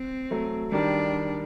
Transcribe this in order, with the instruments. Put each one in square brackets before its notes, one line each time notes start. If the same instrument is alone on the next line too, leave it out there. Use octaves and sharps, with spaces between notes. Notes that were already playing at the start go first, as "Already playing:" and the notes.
Already playing: [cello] C4
[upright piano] F#3 A3
[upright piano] D#3 G3 [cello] D4